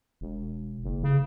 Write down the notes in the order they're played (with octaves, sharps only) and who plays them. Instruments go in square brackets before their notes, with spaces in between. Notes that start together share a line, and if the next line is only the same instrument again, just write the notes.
[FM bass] E1
F#1
C#3